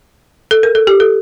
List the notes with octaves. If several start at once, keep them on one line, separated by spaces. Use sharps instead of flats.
A4
A#4
A4
G4
A4